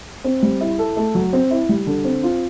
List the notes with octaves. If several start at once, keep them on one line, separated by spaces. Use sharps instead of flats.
C4
G3
E4
A4
A3
F#3
C4
E4
G3
D3
C4
F4